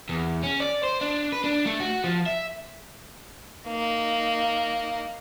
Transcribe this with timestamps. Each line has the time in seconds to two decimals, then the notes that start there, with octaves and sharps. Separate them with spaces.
0.09 E2
0.43 C#4
0.60 D5
0.83 C5
1.01 D4
1.32 B4
1.44 D4
1.66 A3
1.80 F#4
2.04 F3
2.26 E5
3.67 A#3 D#4